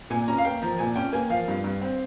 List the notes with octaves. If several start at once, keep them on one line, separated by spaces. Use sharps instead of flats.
A#2 G#5
C#4 A#5
F5
A#3 G5
F3 A#5
A#2 G#5
C#4 G5
A#3 G#5
F3 F5
G2
G2
C4